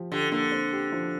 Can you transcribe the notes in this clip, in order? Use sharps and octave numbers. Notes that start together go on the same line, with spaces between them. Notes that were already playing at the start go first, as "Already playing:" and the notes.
Already playing: F3 G4
D3 G4
D3 A#3
C4
G4
F3